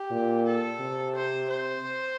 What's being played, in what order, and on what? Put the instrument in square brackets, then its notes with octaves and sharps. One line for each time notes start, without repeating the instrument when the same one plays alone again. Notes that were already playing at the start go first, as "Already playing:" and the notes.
Already playing: [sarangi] G4
[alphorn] A#2
[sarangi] A4
[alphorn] C3
[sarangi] C5
C5